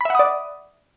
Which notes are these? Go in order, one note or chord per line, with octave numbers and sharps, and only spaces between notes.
D5 E5 F#5 B5 D#6